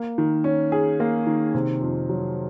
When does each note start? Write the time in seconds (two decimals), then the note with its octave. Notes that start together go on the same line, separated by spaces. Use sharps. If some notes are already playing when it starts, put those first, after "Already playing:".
Already playing: A#3
0.18 D#3
0.44 C#4
0.72 G#4
1.00 A#3
1.27 D#3
1.54 C3
1.81 F2
2.09 F#3